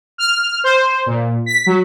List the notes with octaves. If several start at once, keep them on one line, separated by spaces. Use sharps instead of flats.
F6
C5
A#2
B6
F#3